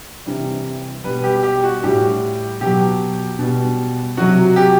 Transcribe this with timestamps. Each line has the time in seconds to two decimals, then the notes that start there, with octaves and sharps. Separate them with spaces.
0.26 C3 E3 G3
1.04 B2 G3 B4
1.24 G4
1.43 G4
1.64 F#4
1.83 A2 G3 G4
2.61 B2 F#3 G4
3.39 B2 G3
4.17 C3 F#3 F#4
4.56 G4